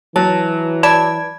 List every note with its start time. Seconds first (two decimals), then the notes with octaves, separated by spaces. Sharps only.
0.16 E3 F#3 A5
0.83 D5 A5 B5 G#6